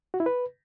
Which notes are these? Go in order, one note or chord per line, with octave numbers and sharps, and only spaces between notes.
F#4
E4
B4